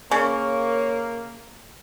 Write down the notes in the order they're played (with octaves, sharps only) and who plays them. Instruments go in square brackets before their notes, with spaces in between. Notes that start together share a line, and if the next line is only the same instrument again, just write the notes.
[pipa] C#3 [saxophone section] A#3 [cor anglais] C#5